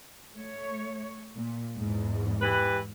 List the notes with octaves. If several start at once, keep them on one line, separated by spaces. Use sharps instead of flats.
A3 C#5
A#2
E2 G#2
E3 G4 B4